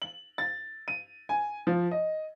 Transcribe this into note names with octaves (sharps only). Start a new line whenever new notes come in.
F#7
A6
D#7
G#5
F3
D#5